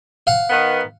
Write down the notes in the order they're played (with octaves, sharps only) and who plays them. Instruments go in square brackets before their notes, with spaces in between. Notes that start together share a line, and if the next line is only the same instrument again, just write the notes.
[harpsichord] F5 F#5
[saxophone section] D#3 B3